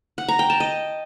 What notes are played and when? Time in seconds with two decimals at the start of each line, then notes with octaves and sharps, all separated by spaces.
0.18 F#5
0.29 A#5
0.39 G5
0.50 A5
0.60 D#5